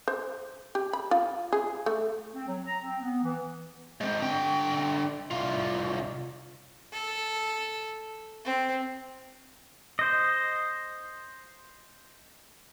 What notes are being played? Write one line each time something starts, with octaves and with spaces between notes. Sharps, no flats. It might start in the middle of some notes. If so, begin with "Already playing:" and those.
C5
G4
B5
F4
G#4
A3
C4
F#3
A#5
C4
B3
E3
G#3 C4
D3 G5
C2 F4
A4
C4
C5 D#5